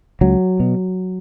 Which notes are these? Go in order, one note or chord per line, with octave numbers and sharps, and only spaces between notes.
C#2 F#3
B2